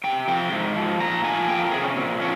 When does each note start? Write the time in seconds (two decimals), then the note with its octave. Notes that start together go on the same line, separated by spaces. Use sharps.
0.04 C3 G5
0.28 F3 G5
0.52 G#2
0.76 F3
1.00 A#2 A#5
1.24 F3 G#5
1.48 F2 G5
1.60 A#4
1.71 C3 G#4
1.84 C#4
1.96 A#2 C4
2.20 F3 C#4